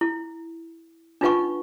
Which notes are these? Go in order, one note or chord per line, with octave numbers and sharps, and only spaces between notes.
E4
D4 D#4 F4 B4 F#5 C#6